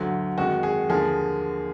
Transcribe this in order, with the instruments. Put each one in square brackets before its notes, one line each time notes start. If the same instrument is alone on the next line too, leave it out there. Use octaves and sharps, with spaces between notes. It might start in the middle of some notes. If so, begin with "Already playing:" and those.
Already playing: [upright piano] D2 D3 F#3
F2 D#3 G#3 F#4
G#4
D#2 D3 F3 A#3 G#4